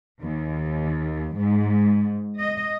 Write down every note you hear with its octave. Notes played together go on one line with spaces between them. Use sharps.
D#2
G#2
D#5